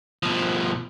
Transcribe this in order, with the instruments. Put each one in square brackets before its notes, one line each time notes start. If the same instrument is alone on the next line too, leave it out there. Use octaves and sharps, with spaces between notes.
[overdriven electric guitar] B2 F3